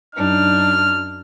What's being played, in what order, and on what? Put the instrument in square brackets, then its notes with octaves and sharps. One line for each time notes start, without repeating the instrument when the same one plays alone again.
[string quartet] F#2 D4 D#4 [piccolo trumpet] F6